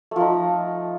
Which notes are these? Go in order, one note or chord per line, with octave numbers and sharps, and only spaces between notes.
F3 A3 D#4